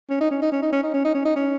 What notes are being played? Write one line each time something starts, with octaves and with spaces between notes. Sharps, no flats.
C#4
D#4
C#4
D#4
C#4
D#4
C#4
D#4
C#4
D#4
C#4
D#4
C#4